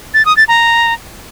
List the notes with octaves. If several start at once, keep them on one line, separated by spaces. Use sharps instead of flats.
A6
D#6
A6
A#5